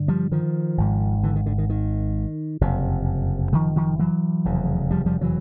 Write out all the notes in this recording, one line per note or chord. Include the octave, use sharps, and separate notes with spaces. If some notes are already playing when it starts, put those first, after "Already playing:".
Already playing: G2 D3
F3 G3
D#3 F3
G#1 G#2
D3 E3
D#3
D3
D#3
D#3
F#1 F2 C3
D#3 F3
D#3 F3
E3 F#3
F1 E2 C#3
F3 G3
F3 G3
E3 F#3